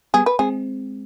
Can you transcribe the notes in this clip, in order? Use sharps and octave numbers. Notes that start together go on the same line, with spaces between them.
G3 B3 G#4
B4
G#3 C4 G#4